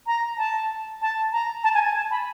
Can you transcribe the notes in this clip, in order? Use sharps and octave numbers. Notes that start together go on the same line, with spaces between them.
A#5
A5
A5
A#5
A5
G#5
G#5
A5
B5